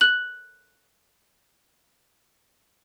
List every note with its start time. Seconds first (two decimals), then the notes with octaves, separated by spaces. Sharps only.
0.01 F#6 F#7